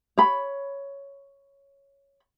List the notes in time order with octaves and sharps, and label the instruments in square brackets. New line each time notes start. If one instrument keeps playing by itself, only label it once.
[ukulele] C#5 B5